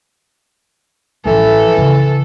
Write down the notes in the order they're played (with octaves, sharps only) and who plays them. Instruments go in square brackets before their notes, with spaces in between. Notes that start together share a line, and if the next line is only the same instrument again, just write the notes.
[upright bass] A1 F3 [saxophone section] E3 [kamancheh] A4
[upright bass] C#3